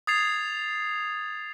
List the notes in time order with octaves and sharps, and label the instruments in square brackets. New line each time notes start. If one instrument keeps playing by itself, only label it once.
[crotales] D#6 G#6 A6 C7 F7